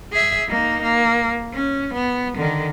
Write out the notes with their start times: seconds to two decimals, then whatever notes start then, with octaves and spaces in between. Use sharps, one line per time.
0.13 G#4 E5
0.48 A#3 D#4
0.82 A#3
1.54 C#4
1.94 B3
2.38 D3 D#3